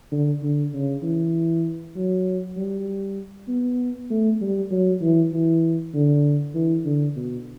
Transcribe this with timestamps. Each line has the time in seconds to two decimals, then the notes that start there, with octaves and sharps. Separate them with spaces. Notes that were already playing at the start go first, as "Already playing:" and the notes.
0.12 D3
0.43 D3
0.73 C#3
1.03 E3
1.96 F#3
2.57 G3
3.48 B3
4.10 A3
4.41 G3
4.71 F#3
5.01 E3
5.32 E3
5.94 D3
6.55 E3
6.85 D3
7.16 B2